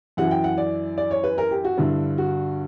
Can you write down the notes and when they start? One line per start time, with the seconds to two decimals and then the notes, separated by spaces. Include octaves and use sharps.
0.17 F#2 E3 F#5
0.31 G5
0.44 F#5
0.58 D5
0.98 D5
1.11 C#5
1.24 B4
1.38 A#4
1.51 G4
1.64 F#4
1.77 G2 D3 E4
2.18 F#4